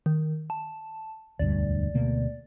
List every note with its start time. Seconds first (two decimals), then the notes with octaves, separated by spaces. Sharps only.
0.06 D#3
0.50 A5
1.39 E1 D2 G2 D5
1.94 D2 B2 A#3